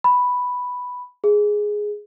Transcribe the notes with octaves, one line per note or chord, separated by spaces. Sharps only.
B5
G#4